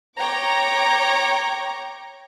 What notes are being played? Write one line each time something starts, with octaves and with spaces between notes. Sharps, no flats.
C#5 G5 A#5 D6